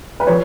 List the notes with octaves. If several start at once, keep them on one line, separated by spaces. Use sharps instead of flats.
B4
F3 C#5